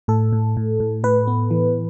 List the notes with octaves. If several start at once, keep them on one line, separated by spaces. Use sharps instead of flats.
A2 A4
A2
A2
A2
A2 B4
B3
E3